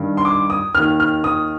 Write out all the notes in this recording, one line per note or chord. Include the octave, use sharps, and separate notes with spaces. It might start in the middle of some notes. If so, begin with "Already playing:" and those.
Already playing: G2 D#3
C6
D6
D#6
D#2 D#3 F6
F6
D#6